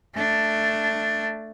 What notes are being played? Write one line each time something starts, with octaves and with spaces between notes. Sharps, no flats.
A3 D4